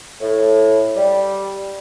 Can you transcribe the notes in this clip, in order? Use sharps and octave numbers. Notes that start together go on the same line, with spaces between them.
A2
G3